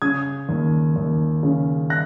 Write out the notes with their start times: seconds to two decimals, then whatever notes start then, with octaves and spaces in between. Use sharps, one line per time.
0.02 C#3 D#6 G#6
0.49 D#2
0.96 D#2
1.43 C#3
1.90 F#6 A#6